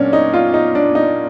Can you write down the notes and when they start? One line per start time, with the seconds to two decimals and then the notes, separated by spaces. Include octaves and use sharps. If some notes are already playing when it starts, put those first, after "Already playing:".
Already playing: A#2 F#3 C#4 D4
0.13 D#4
0.33 F4
0.54 D#4
0.75 D4
0.95 D#4